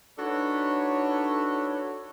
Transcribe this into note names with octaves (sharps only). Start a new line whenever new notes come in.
D4 D#4 F#4 A4 B4 C#5